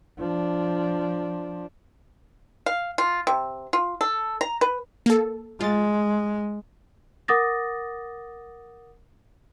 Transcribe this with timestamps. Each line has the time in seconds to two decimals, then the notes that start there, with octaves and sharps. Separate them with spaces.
0.18 F3 D4
2.66 F5
2.98 F4
3.27 C3
3.73 F4
4.01 A4
4.41 A#5
4.61 B4
5.06 A#3 A4
5.61 G#3 F4 A6
7.28 A#4 F#5 D6 D#6 A6 A#6